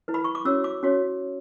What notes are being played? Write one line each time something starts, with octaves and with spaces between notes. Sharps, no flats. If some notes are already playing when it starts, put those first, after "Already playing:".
E4 B4
B5
C#6
D6
C#4 F#4 C#5 E6
D6
C#4 F#4 C#5